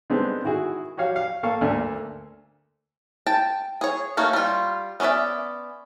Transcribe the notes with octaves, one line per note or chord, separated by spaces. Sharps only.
D3 G3 G#3 B3 C4 D#4
D#3 E4 F#4 G#4
F#4 G4 C#5 F5
F5
A#3 A4 F5 C#6
D2 A3 A#3 D4 G#5 F6
G5 A5
G#4 C#5
A3 A#3 C#4 D#4 F#4
G3 F4
B3 C#4 B4 D5 E5